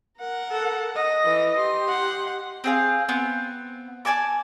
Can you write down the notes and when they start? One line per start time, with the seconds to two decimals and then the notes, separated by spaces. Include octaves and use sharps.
0.19 A#4 F#5
0.51 A4
0.96 D#5
1.25 E3
1.57 G4 C6
1.88 F#5
2.64 C4 G#4 F5
3.09 B3 C4
4.05 D5 G#5 A5 D6